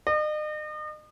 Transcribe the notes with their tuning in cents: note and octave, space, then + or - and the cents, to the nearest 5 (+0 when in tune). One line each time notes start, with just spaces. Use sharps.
D#5 -40